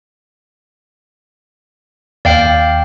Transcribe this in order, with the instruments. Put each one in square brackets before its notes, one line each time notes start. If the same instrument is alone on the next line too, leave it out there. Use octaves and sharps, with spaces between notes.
[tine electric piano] D#2 [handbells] D5 F5 G5